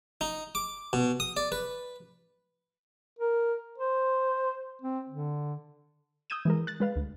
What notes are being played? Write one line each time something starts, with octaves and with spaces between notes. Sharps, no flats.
D#4
D6
B2
D#6
D5
B4
A#4
C5
C4
D3
D#6 E6 G6 G#6 D#7 E7
E3 G#3 A#4
F#6 A6
G#3 B4 F5
D2